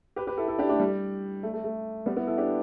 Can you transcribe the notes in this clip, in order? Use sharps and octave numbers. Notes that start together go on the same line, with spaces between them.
G4 B4
G4 B4
E4 A4
E4 A4
D4 G4
A3 D4
G3
A3
A3
A3
G3 B3
B3 E4
E4 A4
D4 G4